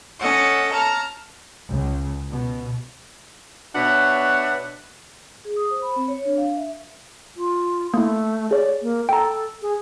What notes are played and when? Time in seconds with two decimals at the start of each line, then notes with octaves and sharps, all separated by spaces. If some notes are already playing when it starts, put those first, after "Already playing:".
0.20 C#4 A4 D#5 F#5
0.72 A5 A#5 F6
1.69 C#2
2.30 B2
3.75 B2 D4 B4 C#5 E5 F#5
5.45 G#4
5.56 D#6
5.71 C5
5.82 B5
5.96 C4
6.08 C#5
6.25 D4
6.38 F5
6.57 E5
7.36 F4
7.94 A3 A#3 E4
8.51 G#4 C#5 D5
8.82 A#3
9.09 A4 G5 A#5
9.62 G#4